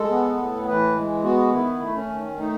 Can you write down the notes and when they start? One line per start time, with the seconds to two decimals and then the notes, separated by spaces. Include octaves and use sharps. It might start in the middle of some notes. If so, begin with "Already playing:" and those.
Already playing: G#3 A4
0.10 B3
0.38 A2
0.67 E3 B4
0.95 G#3
1.24 B3 F#4
1.52 D#3 E4
1.81 A3
1.95 C#4
2.10 D#3
2.38 A3 D#4